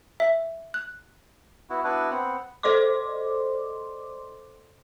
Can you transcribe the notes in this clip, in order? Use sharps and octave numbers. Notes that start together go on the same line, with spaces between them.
E5
F#6
B3 E4 F#4
B3 D4 E4 F#4 B4
B3 C4 F#5
A4 C5 D5 D#5 C6 D6